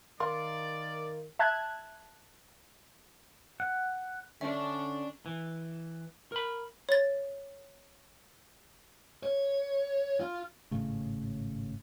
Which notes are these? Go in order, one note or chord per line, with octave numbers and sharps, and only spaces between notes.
D#3 A#4 D5 F5 C6
E5 A5 F#6 G#6
F#5
D3 C#4 D4 C#5 E5
E3
A#4 B5
C#5 A6
C#5
F4
G#1 A2 C#3 A3